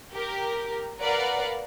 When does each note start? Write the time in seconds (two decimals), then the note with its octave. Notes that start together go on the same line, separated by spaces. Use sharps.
0.13 G4 A#4
1.00 A#4 B4 D5 F5 F#5